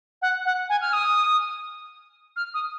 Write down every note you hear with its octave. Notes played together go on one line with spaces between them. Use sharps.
F#5
F#5
G#5
F6
D#6
F6
D#6